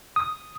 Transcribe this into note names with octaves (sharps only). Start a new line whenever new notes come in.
D#6